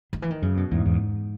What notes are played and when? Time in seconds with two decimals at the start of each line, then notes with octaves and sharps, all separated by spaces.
0.13 D#3
0.22 E3
0.30 D#3
0.42 F#2 C#3
0.57 B2
0.71 E2 G#2
0.86 E2